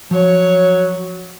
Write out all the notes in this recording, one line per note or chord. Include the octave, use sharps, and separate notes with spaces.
F3 F#3 C#5